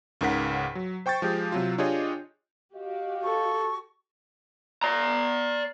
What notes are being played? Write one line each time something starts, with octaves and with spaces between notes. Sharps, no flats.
C#2 G#2 C#3 A#4 F#5 B6
F#3
C5 G5 C#6 G6 A6
F3 G#3 G4 G#4
C3 F#3 F4
D4 F4 G4 G#4 C#5 D#5
F#4 G4 D#5 F5
A4 C#6
D5 A#5